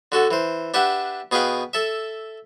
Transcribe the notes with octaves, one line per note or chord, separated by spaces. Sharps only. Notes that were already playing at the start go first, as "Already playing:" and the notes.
D3 F#4 A4
E3 C5
D4 G4 B4 E5 F#5
B2 G#4 B4 F5 G5 B5
A4 E5